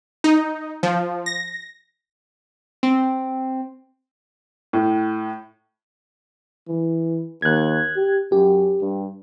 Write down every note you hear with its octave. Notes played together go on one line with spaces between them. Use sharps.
D#4
F3
A#6
C4
A2
E3
D#2 F#6 G#6
G4
F#2 G4
G2